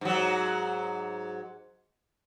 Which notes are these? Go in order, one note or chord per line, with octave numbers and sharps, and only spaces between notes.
G#2 F#3